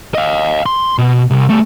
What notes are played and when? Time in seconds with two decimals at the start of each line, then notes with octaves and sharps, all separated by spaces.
0.14 D#5 F5
0.66 C6
0.98 B2
1.31 C2
1.49 G3 A3